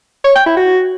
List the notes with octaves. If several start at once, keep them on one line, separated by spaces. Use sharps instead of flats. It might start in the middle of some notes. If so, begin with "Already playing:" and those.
C#5
G5
E4
F#4